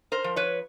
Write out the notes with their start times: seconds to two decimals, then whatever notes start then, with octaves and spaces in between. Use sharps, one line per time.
0.12 A#4 C5
0.24 F3
0.36 B4 C#5